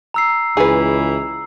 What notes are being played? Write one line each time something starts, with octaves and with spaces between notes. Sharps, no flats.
A#5 E6 C7
C#2 E3 G#4 B4